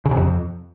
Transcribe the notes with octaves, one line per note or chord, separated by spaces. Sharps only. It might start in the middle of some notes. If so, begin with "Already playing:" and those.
C#3
C3
F2